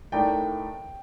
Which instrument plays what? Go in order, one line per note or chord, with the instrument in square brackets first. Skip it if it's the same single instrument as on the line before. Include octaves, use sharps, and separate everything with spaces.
[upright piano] A2 A3 D#4 A#4 D5 [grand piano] G5